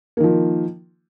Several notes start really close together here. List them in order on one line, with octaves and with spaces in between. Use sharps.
A#3 D#3 F3